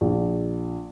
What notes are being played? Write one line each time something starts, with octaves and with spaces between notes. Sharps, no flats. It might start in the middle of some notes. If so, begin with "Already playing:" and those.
A#1